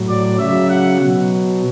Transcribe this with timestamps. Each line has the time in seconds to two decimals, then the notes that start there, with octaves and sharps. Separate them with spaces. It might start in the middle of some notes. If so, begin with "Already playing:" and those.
Already playing: A2 F#3
0.09 D5
0.39 C#3 F#3 E5
0.70 F#5
1.01 B2 F#3